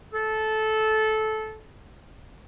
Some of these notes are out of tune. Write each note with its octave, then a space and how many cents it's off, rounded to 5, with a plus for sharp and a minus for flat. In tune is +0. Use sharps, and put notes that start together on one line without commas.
A4 -15